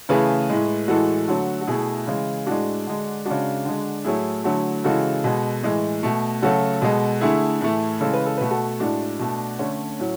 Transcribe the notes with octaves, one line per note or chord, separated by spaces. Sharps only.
C#3 E3 A3 G#4 B4
A2 G#3
A2 E3 G#3 F#4 A4
D3 F#3 A3
F#4
B2 A3 E4 G#4
C#3 E3 G#3
A2 G#3 D4 F#4
D3 G#3
C#3 G#3 D4 F#4
D3 G#3
A2 F#3 A3 E4 G#4
D3 F#3 A3
C#3 E3 G#3 F#4 A4
B2 G#3
A2 E3 G#3
B2 A3
C#3 F#3 A3 F#4 A4
B2 G#3
D3 A3 E4 G#4
A2 E3 A3
C#3 E3 G#3 A4
B4
A4
B2 A3 B4
F#4 A4
A2 G#3 D4 F#4
B2 A3
D3 A3 C#4
A2 F#3